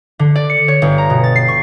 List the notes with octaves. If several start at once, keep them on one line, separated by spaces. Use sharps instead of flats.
D3
D5
C#7
C#5
G1
A#5
B2
A6
C7
C#6